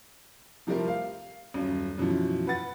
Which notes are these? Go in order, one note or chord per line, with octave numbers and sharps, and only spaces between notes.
C3 F3 G3 A3 C4 A#4
F5
D#1 F#2
F#2 B2 E3 F3
B4 F#5 A6